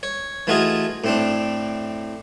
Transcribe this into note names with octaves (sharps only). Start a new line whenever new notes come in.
C#5
E3 A3 F4 F#4 G#4 D#5
A2 C4 D4